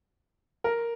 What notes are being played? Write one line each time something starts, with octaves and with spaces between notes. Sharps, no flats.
A#4